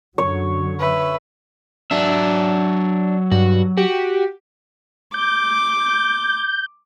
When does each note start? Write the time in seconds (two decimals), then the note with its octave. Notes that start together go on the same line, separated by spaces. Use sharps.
0.18 F#2 D3 F#3 C#5
0.79 B4 E5
1.91 F#3 D4 E5
3.32 G2 F#4
3.77 F#4 G4
5.14 D6 G6